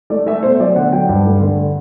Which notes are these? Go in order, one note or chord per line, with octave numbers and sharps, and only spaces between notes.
A3 D5
A3 E5
B2 C5
F#3 D5
D3 F#5
F#3 G5
G2
A3
D3